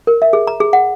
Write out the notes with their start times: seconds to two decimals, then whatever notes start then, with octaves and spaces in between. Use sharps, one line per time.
0.07 A#4
0.22 E5
0.33 G#4
0.47 A#5
0.60 G#4
0.73 F#5